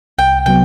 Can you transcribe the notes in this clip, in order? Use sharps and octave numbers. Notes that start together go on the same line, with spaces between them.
C2 G5
C3 F#3 B3 G5